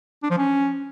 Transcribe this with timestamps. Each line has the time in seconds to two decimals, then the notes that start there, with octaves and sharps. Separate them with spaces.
0.23 D4
0.30 F3
0.38 C#4